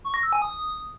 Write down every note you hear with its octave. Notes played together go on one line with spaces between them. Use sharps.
C#6
A#6
E6
G#5
D#6